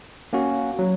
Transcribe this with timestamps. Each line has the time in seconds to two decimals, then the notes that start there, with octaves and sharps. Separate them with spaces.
0.33 A#3 C#4 F#4
0.79 F#3